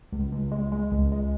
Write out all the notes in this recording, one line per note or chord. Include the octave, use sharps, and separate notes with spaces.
C#2
C#2
G#3
G#3
C#2
G#3